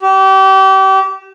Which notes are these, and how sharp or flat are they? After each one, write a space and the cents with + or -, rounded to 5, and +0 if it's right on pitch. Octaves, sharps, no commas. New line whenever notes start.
G4 -35